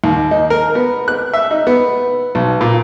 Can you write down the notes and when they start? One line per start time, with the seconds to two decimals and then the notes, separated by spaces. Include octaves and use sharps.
0.04 D#2
0.31 D#4
0.50 A#4
0.75 B3
1.08 F#6
1.33 E5
1.51 D#4
1.67 B3
2.35 B1
2.61 A#2